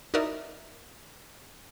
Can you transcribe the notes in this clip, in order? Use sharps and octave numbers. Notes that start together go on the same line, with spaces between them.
D#4 E4 F#4 A#4 D5 E5